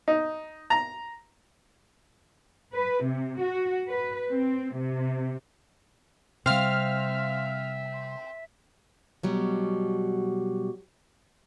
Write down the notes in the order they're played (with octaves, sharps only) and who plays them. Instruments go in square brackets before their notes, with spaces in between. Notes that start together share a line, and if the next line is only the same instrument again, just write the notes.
[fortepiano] D#4
A#5
[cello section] B4
C3
F#4
B4
C4
C3
[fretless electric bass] C3 G3 [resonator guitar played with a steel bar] C4 [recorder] E5 [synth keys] F5 F6
[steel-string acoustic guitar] B2 F#3 G3